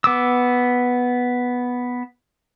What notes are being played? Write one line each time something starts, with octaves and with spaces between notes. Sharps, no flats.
B3 D6 E6